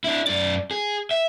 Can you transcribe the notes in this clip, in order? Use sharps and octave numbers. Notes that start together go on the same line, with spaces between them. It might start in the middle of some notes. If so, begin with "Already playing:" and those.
D4 E4
F#2 D5
G#4
E5